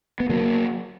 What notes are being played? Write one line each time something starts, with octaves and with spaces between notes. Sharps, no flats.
B3
D3 F#3 A#3